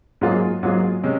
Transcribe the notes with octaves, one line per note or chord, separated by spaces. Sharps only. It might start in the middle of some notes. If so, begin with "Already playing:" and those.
G#2 F#3 A#3 F4 G#4
G#2 F#3 A#3 F4 G#4
C3 G#3 C#4